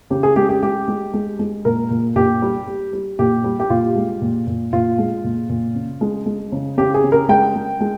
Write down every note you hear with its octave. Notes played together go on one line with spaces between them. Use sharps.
C#3 G4
G#4
G#3 G4
G4
G#3 G4
G#3
G#3
G#3
A#2 A#4
A#2
A#2 G4
G3
G3
G3
A#2 G4
G3
G4
A#2 F4
G#3
A#2
A#2
A#2 F4
G#3
A#2
A#2
C#3
G#3
G#3
C#3
C#3 G4
G#4
C#3
A#4
G#3 G5
G#3
G#3